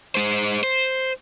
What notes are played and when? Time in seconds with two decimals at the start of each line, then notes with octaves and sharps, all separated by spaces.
0.15 G#3 C5
0.63 C5